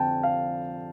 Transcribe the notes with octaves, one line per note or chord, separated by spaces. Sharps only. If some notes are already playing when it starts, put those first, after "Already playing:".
Already playing: F2 D3 F3 C4 G5 A5
F5